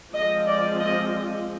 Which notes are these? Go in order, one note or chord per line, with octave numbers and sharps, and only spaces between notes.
F3 G#3 C4 D#5
D5
D#5